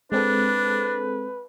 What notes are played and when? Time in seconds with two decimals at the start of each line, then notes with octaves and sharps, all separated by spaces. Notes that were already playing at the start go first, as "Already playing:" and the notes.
0.12 G#3 C4 D4 A4 B4